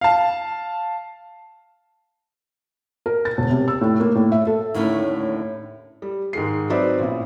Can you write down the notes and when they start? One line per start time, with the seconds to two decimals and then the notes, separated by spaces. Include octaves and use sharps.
0.01 F5 A5
3.06 A#4
3.25 A6
3.38 E1
3.51 C3
3.68 E6
3.81 A2
4.00 A#3
4.15 A2
4.32 E5
4.47 A4
4.74 D#2 A2 D3 A3 C#4 E4
6.02 G3
6.33 G#2 D#3 G#3 C7
6.70 F#3 C4 D#4 B4 D5 E5
6.99 A1 A#2